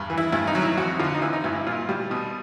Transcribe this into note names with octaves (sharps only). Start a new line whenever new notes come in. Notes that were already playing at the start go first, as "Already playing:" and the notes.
Already playing: E2 G2
E3
E4
G2 E4
D#4
F#3
E4
F2 F#4
D3 F4
D#4
E3 E4
D#4
G2 E4
E4
A#2 F4
G3
B2